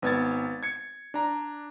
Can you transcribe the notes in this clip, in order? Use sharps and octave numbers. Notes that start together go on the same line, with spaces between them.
G#1 B3 G#6 A6
G#6 C#7
D4 A#5